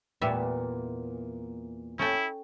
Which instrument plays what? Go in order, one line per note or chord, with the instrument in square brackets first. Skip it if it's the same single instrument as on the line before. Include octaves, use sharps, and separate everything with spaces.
[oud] E2 A#2 B3 [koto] G3 E5
[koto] C#4 A4 G5 [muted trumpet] E4